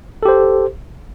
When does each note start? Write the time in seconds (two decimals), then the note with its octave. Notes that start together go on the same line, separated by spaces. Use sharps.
0.23 A4
0.25 G4
0.28 C5